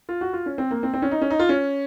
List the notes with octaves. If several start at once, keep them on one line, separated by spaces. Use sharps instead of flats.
F4
F#4
F4
C#4
C4
A#3
C4
C4
C#4
D#4
C#4
D#4
F4
C#4